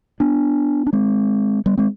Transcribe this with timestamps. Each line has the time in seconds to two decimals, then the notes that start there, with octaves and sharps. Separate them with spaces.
0.20 B3 D4
0.87 D4
0.93 G#3 C4
1.66 G3 B3
1.78 G#3 C4